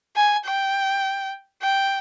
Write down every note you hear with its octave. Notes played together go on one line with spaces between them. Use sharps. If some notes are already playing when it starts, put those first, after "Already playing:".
G#5
G5
G5